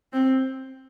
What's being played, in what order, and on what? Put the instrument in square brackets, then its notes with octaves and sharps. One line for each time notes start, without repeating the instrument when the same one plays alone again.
[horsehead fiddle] C4